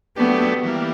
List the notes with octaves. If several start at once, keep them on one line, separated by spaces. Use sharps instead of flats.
F#3 A3 B3 D4 G4
E3 G3 A#3